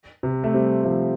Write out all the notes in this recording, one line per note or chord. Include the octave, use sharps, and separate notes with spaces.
C3
A3
G3 C4
F3 A3